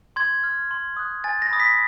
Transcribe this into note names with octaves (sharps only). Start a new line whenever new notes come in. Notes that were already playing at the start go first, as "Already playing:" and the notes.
C6 G#6
F6
C6
D#6 F#6
G#5 A6
A#6
B5 D#6
B6